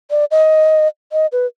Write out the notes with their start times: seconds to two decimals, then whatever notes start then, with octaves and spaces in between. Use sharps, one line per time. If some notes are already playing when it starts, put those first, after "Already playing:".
0.11 D5
0.31 D#5
1.12 D#5
1.32 B4